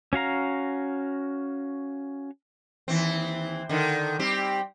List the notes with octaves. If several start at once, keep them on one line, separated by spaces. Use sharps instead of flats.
C#4 F#4 F5 A#5
D#2 E3 C4
D3 D#3
G3 C4 G4